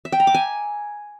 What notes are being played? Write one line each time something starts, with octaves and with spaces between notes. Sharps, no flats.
E5
G5
A#5
D6
G#5